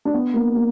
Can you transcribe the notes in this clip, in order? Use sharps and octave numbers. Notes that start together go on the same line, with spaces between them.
D4
B3
A#3
A#3